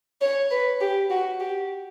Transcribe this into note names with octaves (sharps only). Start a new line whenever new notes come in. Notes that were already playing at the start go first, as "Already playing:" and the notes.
C#5
B4
G4
F#4
G4